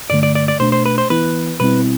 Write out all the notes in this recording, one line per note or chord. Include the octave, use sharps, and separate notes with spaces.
G2 D3 A3 D5
D5
D5
D5
B2 A3 D4 C5
C5
B4
C5
E3 B3 E4 B4
B2 G3 C4 E4 B4